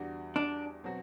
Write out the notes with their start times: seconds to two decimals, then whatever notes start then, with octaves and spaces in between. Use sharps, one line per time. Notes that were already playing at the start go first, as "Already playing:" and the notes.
Already playing: E2 D3 G3 D4 F#4
0.36 D4
0.84 B2 F#3 C4 F#4